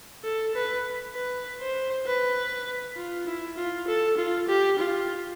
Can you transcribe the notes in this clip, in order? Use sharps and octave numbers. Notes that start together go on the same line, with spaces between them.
A4
B4
B4
C5
B4
F4
E4
F4
A4
F4
G4
F4